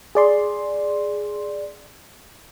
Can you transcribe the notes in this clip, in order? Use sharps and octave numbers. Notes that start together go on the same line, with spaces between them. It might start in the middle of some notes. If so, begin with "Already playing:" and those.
G#4 D5 C6